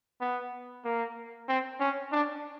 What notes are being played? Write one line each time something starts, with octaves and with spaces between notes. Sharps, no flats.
B3
A#3
C4
C#4
D4